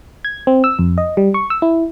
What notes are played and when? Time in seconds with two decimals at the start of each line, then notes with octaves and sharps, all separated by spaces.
0.25 G#6
0.47 C4
0.64 E6
0.79 F2
0.98 D#5
1.17 G3
1.34 C#6
1.50 E6
1.62 E4